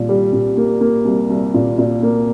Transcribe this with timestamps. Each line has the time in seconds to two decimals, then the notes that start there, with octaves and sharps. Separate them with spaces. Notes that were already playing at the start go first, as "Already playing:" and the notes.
Already playing: C2 A#2
0.09 G3
0.33 A#2
0.57 A#3
0.81 A#3
1.05 C2
1.30 C2
1.54 A#2
1.78 A#2
2.03 A#3